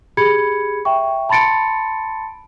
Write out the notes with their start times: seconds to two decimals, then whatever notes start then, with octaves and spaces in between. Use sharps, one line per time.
0.17 G4 G#4 B5 G#6 C#7
0.85 E5 G5 C#6
1.29 A5 B5 C6 A6 C#7 D7